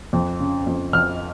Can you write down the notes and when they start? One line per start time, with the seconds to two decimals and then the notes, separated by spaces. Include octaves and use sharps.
0.13 F2
0.40 C#3
0.67 F2
0.93 F2 F6